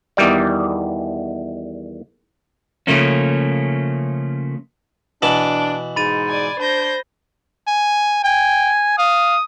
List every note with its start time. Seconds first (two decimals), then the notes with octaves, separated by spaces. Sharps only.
0.17 E2 D#3 E3 G3 D5
2.87 C#3 F3 A3 A#3 C#4
5.22 B2 E3 D4 A5 F#7
5.96 G#2 B5 A6 D#7
6.28 D5 G#5
6.59 D4 C5 G6 A#6
7.67 G#5
8.24 G5 G#5
8.98 F5 D#6